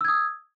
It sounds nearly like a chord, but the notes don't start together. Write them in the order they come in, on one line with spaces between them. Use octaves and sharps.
E6 G#6 D#6